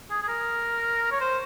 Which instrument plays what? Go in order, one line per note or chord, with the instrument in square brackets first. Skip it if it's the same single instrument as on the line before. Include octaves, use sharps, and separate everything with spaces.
[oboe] G#4
G#4
A#4
C#5
C5